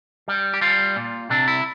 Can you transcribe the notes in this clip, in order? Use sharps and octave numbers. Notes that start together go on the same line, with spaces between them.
G3
G4
G3 F4
A#2
C3 D4
E4